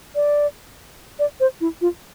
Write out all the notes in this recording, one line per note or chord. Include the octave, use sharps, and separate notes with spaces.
D5
D5
C5
E4
F4